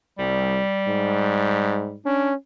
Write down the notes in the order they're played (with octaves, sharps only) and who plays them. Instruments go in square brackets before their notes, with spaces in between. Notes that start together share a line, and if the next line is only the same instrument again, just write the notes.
[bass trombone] C2 [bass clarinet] G3
[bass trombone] G#2
[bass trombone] C#4 [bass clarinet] D4